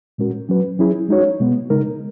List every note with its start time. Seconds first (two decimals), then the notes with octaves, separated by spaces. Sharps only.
0.18 A#2 G#3 C#4 F#4 A#4
0.49 F#3 C#4 F#4 B4
0.79 F#3 C#4 E4 G#4
1.08 G#3 D#4 F#4 C#5
1.40 B2 G#3 B3
1.70 C#3 G#3 D#4 A#4